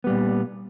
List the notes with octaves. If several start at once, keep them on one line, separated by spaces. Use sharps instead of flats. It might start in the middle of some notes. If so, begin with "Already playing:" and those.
A#2 G3 B3